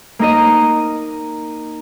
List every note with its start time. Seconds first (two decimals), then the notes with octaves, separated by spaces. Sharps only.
0.19 A#3 D#4 A#4 D#5